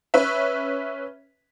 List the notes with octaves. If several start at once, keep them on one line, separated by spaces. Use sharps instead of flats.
C#4 B4 E5